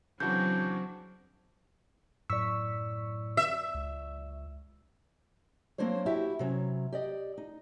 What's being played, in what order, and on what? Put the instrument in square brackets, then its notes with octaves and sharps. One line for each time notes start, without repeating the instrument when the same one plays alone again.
[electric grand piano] C#3 E3 F#4 [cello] F#3 C4 [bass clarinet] D4 [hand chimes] G6
[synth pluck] F#2 C#6 B6 [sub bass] A2 [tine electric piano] D5 E6
[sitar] E5
[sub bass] C#2
[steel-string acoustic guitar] F#3 A#3 C4 D4 C5 C#5
E4 F#4 G4 E5
C3 F#3 C#4
G4 D5 D#5
D#4